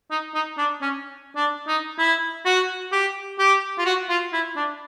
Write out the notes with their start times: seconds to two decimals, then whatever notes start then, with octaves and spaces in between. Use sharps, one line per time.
0.11 D#4
0.34 D#4
0.58 D4
0.82 C#4
1.36 D4
1.67 D#4
1.99 E4
2.45 F#4
2.92 G4
3.39 G4
3.78 F4
3.86 F#4
4.09 F4
4.33 E4
4.56 D4